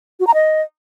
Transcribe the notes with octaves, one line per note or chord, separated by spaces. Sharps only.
F#4
A#5
D#5